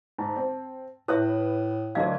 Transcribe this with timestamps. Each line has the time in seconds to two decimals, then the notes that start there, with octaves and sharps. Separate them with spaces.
0.18 G#2 A5
0.36 C4
1.08 A2 E4 B4 C#5 E5 D#6 F#6
1.95 D2 F#3 D4 A#4 D#5 F5 G#6